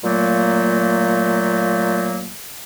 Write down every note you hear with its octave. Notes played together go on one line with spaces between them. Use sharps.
A#2 F#3 A3 A#3